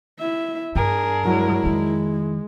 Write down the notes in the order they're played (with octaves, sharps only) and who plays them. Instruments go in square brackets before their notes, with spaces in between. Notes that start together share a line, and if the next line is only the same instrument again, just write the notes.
[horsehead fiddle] E4 E5
[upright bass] G2 [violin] D4 A#4 [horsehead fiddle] G#4
[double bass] F#3 G#3 [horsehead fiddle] E4
[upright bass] F2 D#3 [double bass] G#3